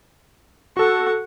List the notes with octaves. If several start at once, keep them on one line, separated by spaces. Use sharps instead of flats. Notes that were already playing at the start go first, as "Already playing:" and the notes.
F#4 A4 F#5 C#6